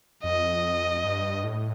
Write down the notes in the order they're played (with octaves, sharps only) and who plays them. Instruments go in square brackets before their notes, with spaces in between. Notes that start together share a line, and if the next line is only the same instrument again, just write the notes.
[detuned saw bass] F2 [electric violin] D#5
[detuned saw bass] G2
A2